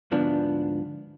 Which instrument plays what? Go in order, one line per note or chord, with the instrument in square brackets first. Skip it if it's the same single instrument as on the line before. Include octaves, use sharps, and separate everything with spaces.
[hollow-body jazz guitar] D2 G#2 F3 B3 D4